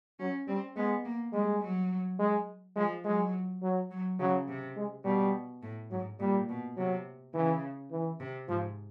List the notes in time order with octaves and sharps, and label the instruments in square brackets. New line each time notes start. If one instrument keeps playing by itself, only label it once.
[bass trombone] F#3 [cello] C#4
[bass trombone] G3 [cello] C4
[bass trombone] G#3 [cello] B3
[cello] A#3
[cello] G3 [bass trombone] G#3
[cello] F#3
[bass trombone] G#3
[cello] F3 [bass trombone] G#3
[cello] F#3 [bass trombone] G#3
[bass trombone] F#3
[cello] F#3
[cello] C#3 [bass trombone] F#3
[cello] C3
[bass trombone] G#3
[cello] B2 [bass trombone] G3
[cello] A2
[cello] G#2 [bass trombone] F#3
[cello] A#2 [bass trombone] G3
[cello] B2
[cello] C3 [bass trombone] F#3
[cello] C#3 [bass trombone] E3
[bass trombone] E3
[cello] C3
[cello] G#2 [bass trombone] F3